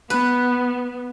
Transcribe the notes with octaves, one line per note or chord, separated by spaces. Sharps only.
B3 B4